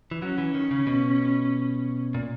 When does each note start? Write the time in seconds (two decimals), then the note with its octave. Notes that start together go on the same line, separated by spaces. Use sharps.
0.11 E3
0.22 F#3 C#4
0.38 E3
0.54 D#3
0.71 C#3
0.87 B2
2.14 A#2